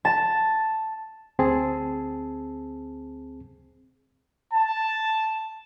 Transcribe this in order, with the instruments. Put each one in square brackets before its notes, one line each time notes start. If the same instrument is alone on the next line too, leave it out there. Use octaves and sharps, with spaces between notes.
[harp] A5
[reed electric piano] D2 C4 G#4 A5
[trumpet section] A5